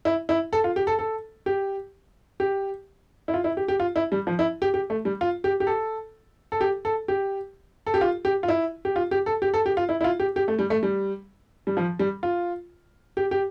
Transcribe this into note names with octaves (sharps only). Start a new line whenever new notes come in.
E4
E4
A4
F4
G4
A4
A4
G4
G4
E4
F4
E4
G4
G4
F4
E4
G3
F3
E4
G4
G4
A3
G3
F4
G4
G4
A4
A4
G4
A4
G4
A4
G4
F4
G4
F4
E4
G4
F4
G4
A4
G4
A4
G4
F4
E4
E4
F4
G4
G4
A3
G3
A3
G3
G3
F3
G3
F4
G4
G4